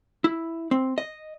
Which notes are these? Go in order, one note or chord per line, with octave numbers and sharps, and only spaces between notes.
E4
C4
D#5